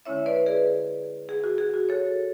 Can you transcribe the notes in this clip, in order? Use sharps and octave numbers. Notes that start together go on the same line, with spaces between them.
D3 G#3 C#4 E4 C#5 E5
B4 D5
G#4 B4
G#4
F#4
G#4
F#4
A4 C#5